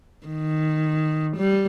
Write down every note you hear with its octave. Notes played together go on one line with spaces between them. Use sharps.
D#3
G3